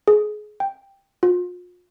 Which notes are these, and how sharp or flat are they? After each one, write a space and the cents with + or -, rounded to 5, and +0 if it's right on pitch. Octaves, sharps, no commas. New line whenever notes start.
G#4 +25
G5 +5
F4 +40